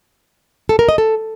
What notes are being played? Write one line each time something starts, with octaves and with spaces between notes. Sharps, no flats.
A4
A#4
D#5
A4